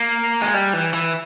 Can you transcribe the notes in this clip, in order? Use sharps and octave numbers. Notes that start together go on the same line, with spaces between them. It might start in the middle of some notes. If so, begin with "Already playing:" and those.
Already playing: A#3
G#3
G3
E3
E3